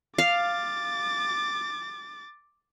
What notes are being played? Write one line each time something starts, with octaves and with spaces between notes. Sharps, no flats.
F5 D6 A6